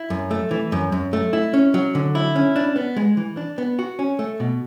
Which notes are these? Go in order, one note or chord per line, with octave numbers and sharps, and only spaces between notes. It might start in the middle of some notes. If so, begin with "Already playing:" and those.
Already playing: E4
F#2
A3
E3
F#2
F#2
A3
E4
C#4
F#3
D3
E4
C#4
D4
B3
G#3
E3
D4
B3
F#4
C#4
A3
B2